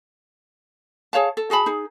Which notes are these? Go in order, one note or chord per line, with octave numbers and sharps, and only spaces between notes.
G#4 C#5 F5 A5
A4
F#4 G#4 A5 B5
D#4 G#4